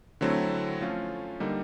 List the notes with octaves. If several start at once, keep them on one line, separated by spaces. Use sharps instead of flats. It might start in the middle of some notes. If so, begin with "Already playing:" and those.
D3 F#3 A3 C4 E4
F3 A3 C#4 F4
D3 G3 A#3 D#4